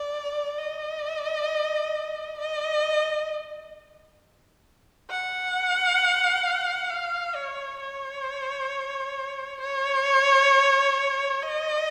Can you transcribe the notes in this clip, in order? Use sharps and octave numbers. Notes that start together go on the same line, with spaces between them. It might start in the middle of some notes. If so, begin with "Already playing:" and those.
Already playing: D5
D#5
D#5
F#5
F5
C#5
C#5
C#5
D#5